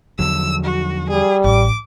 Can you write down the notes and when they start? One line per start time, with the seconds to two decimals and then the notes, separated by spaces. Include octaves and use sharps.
0.19 E2 D3 F3 F#3 E6
0.64 F#4
1.09 G3 G#4
1.44 A1 D6